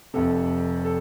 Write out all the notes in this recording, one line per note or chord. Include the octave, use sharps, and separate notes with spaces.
F1 F2 C3 A4
A4